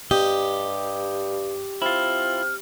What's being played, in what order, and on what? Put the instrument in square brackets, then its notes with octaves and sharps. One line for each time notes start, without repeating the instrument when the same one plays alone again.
[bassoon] G2 [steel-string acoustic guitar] G4 [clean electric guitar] D#5
[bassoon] C4 [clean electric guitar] E4 F4 [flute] F6